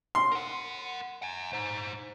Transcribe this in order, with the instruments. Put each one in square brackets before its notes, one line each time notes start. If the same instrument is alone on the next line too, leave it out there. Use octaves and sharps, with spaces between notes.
[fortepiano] C6
[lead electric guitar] A#4 F#5
F#5 G#5
D#4 C5